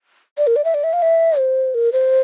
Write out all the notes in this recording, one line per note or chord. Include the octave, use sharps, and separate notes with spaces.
D5
A#4
D5
E5
D5
E5
F5
E5
C5
A#4
C5